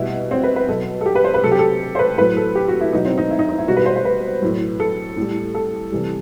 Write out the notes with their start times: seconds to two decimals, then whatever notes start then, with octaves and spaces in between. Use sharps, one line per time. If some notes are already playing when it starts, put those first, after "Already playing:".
Already playing: B2 G3 E4
0.31 C4
0.43 B4
0.56 B4
0.68 B2 F#3 A4
1.01 A4
1.06 G4
1.15 B4
1.24 C5
1.34 B4
1.43 C3 F#3 A4
1.51 G4
1.59 A4
1.95 C5
1.99 B4
2.18 A2 F#3 B4
2.37 A4
2.55 G4
2.68 F#4
2.80 E4
2.93 B2 F#3 D#4
3.05 C4
3.18 D#4
3.31 E4
3.39 D#4
3.49 D#4
3.58 E4
3.67 B2 G3 F#4
3.77 B4
3.86 C5
3.96 C5
4.05 B4
4.42 A2 F#3
4.80 A4
5.17 A2 G3
5.55 A4
5.92 C3 E3 G3